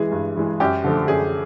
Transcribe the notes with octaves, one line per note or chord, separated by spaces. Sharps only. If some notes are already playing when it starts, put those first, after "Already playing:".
Already playing: E3 G#3 G#4
G2
E3 G#3
F#2 G4
D3 F3 A3
F#2 G#4